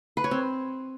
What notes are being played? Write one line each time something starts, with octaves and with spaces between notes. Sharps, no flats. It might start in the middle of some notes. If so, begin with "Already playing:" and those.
B4
C#5
C4